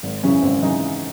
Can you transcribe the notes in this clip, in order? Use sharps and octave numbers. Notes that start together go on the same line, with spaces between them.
G#1
F#2 C#3 E3 C#4
G#1 C4
C#3 E3 D#4